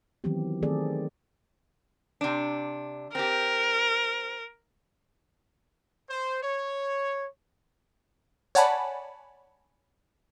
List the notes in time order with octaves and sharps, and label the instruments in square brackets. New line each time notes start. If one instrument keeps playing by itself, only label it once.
[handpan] D#3 E3 F#3 B3 C4 G4
D#3 A3 C4 G#4 A4 D5
[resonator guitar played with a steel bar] C3 D4
[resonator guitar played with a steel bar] C4 G4 [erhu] A#4
[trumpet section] C5
C#5
[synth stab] C#5 D5 F#5 G#5 A5 B5